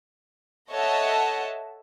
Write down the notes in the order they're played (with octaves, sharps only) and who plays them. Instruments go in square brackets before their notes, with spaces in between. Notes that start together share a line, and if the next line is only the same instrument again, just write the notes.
[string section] A4 C#5 D#5 E5 F#5 A5